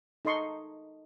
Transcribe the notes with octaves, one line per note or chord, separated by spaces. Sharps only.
D#4 A4 D#5 C6 C#6